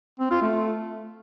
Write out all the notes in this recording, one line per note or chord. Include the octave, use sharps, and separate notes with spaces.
C4
F4
A3